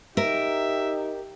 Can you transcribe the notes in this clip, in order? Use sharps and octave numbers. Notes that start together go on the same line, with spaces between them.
D#4 G4 A#4 E5